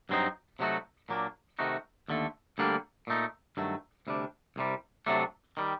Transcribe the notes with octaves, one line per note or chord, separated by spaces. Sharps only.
G2 F#3 C4 D#4
C3 F#3 A3 D#4 F#4
A#2 F#3 A#3 D4
C3 D#3 A3 D#4 F#4
D#2 D3 A3
D2 D3 G3 A#3 D4
A#2 A3 D#4
G2 D#3 F#3 A3
D2 C3 G3 D4
C2 C3 G3
C3 F#3 A3 D4
D#3 G3